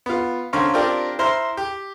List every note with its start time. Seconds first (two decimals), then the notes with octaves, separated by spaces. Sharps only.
0.06 B3 F4
0.53 D3 C4 C#4 C#5 F5 A#5
0.74 C4 D4 F4 G4 A#4 D5
1.19 E4 C5 A#5 C6 F6
1.57 G4